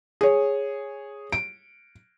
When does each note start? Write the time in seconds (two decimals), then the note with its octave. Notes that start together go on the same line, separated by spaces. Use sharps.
0.21 G#4 C#5
1.32 D7